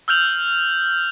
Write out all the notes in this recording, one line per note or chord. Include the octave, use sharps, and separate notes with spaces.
E6 F6 G6 F7 F#7